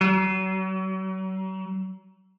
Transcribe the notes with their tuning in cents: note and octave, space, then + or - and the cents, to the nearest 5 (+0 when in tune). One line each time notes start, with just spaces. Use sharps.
F#3 +40